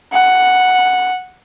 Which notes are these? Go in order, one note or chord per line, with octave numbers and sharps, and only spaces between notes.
F#5